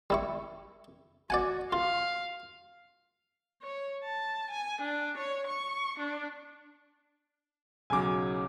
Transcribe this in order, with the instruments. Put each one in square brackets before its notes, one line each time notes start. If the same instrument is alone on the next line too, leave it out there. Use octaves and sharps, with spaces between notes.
[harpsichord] G3 E4 C#6
[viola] F#4 [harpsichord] D5 F#5 G#5
[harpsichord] F4 [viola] F5
[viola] C#5
A5
G#5
D4
C#5
C#6
D4
[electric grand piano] B1 C#3 F#3 [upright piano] G#5 D6